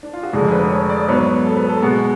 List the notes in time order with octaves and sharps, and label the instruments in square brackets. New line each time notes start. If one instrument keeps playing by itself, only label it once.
[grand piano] D4
F4
F#4
[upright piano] F1 F2 D3 G#3 [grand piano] G#4
[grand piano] B4
C#5
D5
[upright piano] G#2 F#3 B3 [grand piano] B4
[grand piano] A4
B4
A4
[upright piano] B2 G#3 B3 [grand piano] F#4